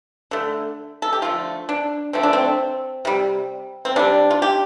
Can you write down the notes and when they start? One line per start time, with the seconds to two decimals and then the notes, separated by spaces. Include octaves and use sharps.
0.31 D3 A3
1.02 A4
1.13 G4
1.22 D3 F3 A3 F4
1.69 D4
2.13 D3 F3 A3 C4
2.23 D4
2.33 C4
3.05 C3 G3
3.85 C4
3.96 C3 G3 D4
4.31 F4
4.42 G4